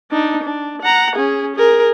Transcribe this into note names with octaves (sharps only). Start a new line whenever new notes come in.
D4 D#4
D4
F#5 A#5
C#4 G#4
G#4 A#4